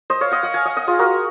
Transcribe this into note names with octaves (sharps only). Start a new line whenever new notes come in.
C5 D#5
C#5 F5
D#5 F#5
D#5 F#5
F5 G#5
D#5 F#5
D#5 F#5
F4 G#4
F#4 A#4